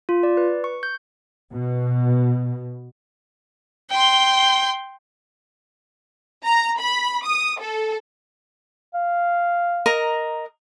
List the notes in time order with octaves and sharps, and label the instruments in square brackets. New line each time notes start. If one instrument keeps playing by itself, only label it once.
[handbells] F4
D5
B4
C#6
G6
[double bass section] B2
[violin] G5 C6
[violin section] A#5
B5
D#6
A4
[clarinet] F5
[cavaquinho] A#4 D#5 A#5